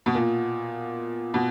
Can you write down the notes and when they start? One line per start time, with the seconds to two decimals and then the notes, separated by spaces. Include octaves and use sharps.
0.06 B2
0.15 A#2
1.34 B2